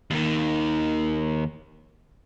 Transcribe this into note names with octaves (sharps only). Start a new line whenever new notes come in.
D#2 D#3